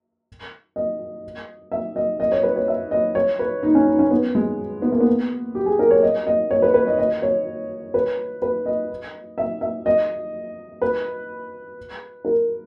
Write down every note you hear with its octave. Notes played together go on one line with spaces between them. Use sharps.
D#5
E5
D#5
D#5
C#5
B4
C#5
E5
D#5
C#5
B4
D#4
C#4
D#4
C#4
B3
G#3
B3
A#3
B3
G4
G#4
A#4
C#5
D#5
D#5
C#5
B4
B4
D#5
D#5
C#5
B4
B4
D#5
E5
E5
D#5
B4
A#4